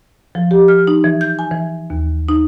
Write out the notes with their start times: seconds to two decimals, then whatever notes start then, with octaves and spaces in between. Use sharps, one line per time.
0.35 F3
0.51 G4
0.68 F6
0.87 D#4
1.04 E3
1.21 G6
1.39 G#5
1.51 E3
1.90 D#2
2.29 D#4